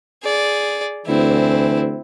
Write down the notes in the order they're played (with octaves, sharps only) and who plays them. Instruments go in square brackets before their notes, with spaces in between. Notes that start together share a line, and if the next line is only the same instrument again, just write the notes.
[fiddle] G#4 D5
[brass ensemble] D2 E3 [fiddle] C4 E4